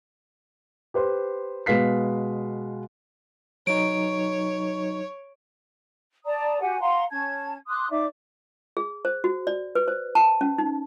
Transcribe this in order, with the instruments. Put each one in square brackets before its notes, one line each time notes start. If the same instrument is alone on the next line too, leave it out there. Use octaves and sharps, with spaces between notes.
[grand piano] G4 B4 C5 C6
B2 G#3 B4 F5 B6 C7
[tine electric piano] F#3 D#4 [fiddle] C#5 [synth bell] D7
[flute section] D5 A5 A#5 D#6
F#4 G4 F#5 G#5
F5 F#5 A#5 C6
C#4 A5 G#6
C6 D6 D#6 F#6
D#4 D5 E5 D6
[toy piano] G#4
C5
F#4
D5
B4
C5
A5
C#4
D#4